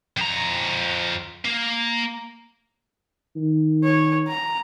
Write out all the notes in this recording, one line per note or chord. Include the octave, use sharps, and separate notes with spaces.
F2 A#5
A#3
D#3
C#5
A#5